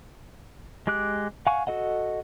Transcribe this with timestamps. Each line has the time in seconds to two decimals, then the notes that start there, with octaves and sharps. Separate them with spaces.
0.87 G#3 G4 D6 F#6
1.47 F5 F#5 G#5 C#6
1.67 F#4 A4 D#5 F#5